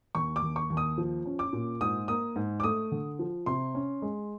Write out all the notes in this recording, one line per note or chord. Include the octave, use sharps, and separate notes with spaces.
D#2 C#6
D6
D#2
C#6
D#2
D#6
F3
C#4
D6
A#2
G#2 D#6
A#3 D#6
G#2
D6
A3 D#6
D3
F3
C3 C6
C#4
G#3